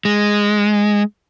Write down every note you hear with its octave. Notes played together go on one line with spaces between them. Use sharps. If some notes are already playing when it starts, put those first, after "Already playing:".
G#3